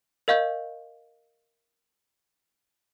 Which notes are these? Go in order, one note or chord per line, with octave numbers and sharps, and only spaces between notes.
A#4 D#5 F5 C#6 G6